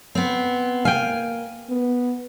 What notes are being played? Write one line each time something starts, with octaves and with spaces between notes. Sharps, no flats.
B3 C4
A#3 F5 G5 G#5
B3